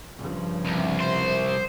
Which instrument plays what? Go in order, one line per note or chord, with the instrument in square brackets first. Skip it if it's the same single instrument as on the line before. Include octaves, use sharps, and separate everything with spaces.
[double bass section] G2 C#3 F3
[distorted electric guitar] C2
[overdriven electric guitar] C5